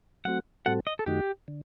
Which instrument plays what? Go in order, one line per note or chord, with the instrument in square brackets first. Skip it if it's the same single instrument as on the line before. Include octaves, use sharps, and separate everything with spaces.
[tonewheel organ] F#3 A3 C4 F#4 [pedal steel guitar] F#5
[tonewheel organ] A2 G3 C4 F#4 A4 [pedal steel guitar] F#5
[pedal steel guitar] D#5
A4
[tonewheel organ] F#2 D#3 A3 D#4 F#4 [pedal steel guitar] G4
[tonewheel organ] D3